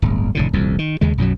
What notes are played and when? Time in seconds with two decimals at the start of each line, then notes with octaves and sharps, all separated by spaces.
0.02 D1 G1
0.35 F1 A2 D3
0.53 D#1 C2 F2
0.79 D#3
1.01 D#2 C#3 G#3
1.18 B1 F#2 B2 F#3